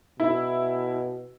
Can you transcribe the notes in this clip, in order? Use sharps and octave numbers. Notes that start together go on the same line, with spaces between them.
B2 E4